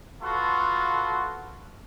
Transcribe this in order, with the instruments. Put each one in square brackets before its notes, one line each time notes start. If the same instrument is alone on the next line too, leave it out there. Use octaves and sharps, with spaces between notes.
[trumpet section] F4 F#4 A4 B4 C6